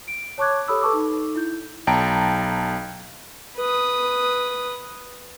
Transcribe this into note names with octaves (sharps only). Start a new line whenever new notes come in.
D7
C#5 A5 C#6 D6 F#6 G#6
G4 A4 C#5 B5 D#6 E6
A4 B4 A5 C#6 D6 E6
D#4 A4
E4 G6
B1 G5 A5 A#5 D7
B4 D#6